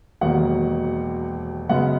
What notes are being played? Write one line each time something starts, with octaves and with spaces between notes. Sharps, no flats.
E1 D#2 D#3 F#3 A#3 F#5
F#2 C#3 G#3 B3 F#5